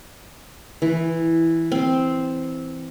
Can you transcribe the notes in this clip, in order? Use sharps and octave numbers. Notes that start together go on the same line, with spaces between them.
E3
C4